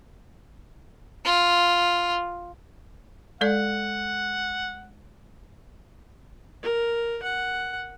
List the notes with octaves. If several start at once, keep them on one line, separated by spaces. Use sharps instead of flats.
F4
G#3 A4 D5 F#5
A#4
F#5